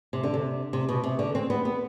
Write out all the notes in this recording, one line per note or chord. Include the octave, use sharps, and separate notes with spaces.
C3
D3
C3
C3
B2
C3
D3
C4
B3
B3